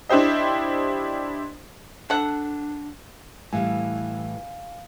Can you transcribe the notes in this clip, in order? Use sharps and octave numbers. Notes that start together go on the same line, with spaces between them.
D4 E4 G4 C5 D#5
D4 A4 F#5
A2 E3 G3 F5 G#5